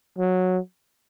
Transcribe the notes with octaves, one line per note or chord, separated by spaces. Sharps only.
F#3